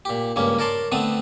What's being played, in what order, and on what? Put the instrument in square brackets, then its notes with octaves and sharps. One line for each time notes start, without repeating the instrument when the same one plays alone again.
[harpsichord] A#2 G4
C#2 G2 A#3 C#4
A#4 C#5 D5 A5 C6
D3 A3 B3 C4 D#6